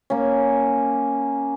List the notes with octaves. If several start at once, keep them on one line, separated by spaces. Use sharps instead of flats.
A#3 C#4